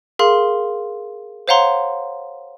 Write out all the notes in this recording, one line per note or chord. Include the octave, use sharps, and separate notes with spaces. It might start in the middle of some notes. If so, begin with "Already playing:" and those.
G#4 A#4 F5 C6
C5 C#5 F5 F#5 A#5 C6